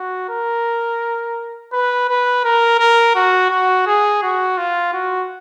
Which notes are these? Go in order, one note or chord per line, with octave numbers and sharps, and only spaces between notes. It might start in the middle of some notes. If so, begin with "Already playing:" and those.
Already playing: F#4
A#4
B4
B4
A#4
A#4
F#4
F#4
G#4
F#4
F4
F#4